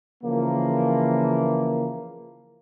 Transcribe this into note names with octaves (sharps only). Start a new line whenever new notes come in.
C#3 E3 F3 A#3